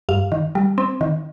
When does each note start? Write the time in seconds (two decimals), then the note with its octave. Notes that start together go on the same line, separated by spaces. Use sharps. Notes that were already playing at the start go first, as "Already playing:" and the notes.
0.09 G2 F5
0.32 D#3
0.55 G3
0.78 C4
1.01 D#3